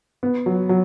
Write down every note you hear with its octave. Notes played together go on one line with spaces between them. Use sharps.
B3
F#3
F#3